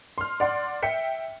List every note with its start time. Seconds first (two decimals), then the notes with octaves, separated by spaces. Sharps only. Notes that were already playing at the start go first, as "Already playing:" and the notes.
0.18 C6 F6
0.40 D5 F#5 C6
0.83 E5 G5 B6 C#7